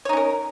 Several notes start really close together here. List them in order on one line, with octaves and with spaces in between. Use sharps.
C#5 D#4 C#4 A#4